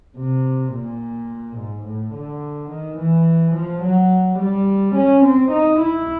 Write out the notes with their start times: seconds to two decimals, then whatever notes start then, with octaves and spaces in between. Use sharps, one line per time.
0.18 C3
0.73 A#2
1.57 G#2
1.86 A2
2.14 D3
2.71 D#3
2.98 E3
3.55 F3
3.83 F#3
4.39 G3
4.96 C#4
5.24 C4
5.52 D#4
5.80 E4